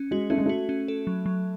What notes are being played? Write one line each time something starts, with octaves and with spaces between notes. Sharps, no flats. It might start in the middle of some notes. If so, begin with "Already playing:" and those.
Already playing: C#4
G#3 F#4
A3 C#4
G#3
A3 F#4
C#4
A4
F#3
F#3